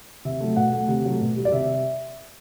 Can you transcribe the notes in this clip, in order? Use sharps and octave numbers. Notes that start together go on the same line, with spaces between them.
C3 E5
F#3 A3
B2 F#5
A3
C3
F#3 A3
B2
G3
D5
C3 E5